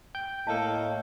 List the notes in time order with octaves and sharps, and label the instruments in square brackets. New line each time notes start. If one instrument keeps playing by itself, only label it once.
[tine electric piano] G5 G6
[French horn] A2 [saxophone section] A#3 A4 D#5 [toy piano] A5